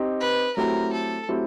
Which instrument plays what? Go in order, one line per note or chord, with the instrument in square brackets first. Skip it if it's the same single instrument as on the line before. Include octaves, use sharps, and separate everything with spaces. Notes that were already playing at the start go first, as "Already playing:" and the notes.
Already playing: [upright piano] C4 D#4 G4
[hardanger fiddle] B4
[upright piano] F#3 A3 C4 E4 G4 [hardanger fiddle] A#4
[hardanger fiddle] A4
[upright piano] F#3 A3 C4 E4 G4